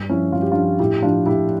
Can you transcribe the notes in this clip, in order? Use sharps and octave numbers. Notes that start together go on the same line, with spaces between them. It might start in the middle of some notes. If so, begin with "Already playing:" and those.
Already playing: G2
F3 C#4 E4
G2 F4
G4
F3 D4 F4
A2 E4 G4
F3 D4 F4
A2 E4 G4